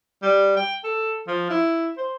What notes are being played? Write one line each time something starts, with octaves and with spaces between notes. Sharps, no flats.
G3
G5
A4
F3
E4
C5